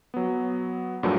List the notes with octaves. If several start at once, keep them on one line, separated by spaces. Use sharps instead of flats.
F#3 B3
G2 A#2 F3 F#3 A3 D4